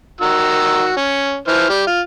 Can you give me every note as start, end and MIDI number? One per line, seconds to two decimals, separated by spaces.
0.21 0.92 51
0.21 0.92 66
0.21 0.92 88
0.96 1.39 61
1.48 1.68 52
1.48 1.68 72
1.48 1.68 89
1.69 1.83 55
1.69 1.83 67
1.87 2.00 65